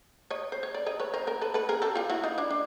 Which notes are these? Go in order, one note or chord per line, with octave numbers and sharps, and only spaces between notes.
C#5 D#5
C5
C#5
D5
C#5 D#5
B4 C#5
A#4 C5
A#4 C5
A4 B4
A4 B4
G#4 A#4
G4 A4
F4 G4
E4 F#4
D#4 F4
D4 E4
D4